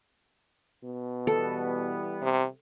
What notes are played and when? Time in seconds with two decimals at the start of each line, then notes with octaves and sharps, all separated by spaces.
0.84 B2
1.27 E3 G3 B3 A4
2.22 C3